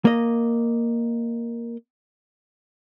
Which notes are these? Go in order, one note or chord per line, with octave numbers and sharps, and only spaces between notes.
A#3 D#5